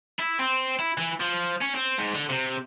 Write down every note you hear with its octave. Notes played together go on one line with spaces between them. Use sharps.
E4
C4
E4
E3
F3
C#4
C4
G#2
D3
C3